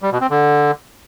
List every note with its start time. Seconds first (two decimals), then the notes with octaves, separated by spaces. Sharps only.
0.02 G3
0.12 B2
0.21 C4
0.30 D3